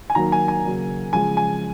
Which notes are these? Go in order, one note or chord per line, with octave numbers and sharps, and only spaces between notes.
G#5
D#3 F#3 A#3 A#5
G#5
G#5
C#3 F#3 A#3
C#3 F3 G#3 G#5
G#5